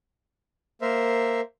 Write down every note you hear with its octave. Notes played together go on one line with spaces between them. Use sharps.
A#3 A#4 C5 E5